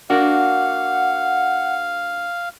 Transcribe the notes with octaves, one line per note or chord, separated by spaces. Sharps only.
A#3 D4 F#4 F5 F#5